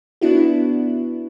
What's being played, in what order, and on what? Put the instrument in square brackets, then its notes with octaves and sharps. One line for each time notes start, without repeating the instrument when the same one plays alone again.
[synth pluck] B3 D4 E4 F#4